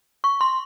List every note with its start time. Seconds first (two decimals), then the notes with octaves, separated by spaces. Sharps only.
0.24 C#6
0.41 C6